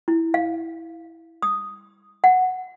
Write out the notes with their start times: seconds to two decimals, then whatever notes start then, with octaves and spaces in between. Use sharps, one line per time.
0.08 E4
0.34 F5
1.42 D#6
2.24 F#5